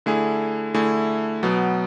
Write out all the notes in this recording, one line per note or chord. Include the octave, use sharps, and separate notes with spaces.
D3 A3 E4 G#4
D3 A3 E4 G#4
B2 F#3 B3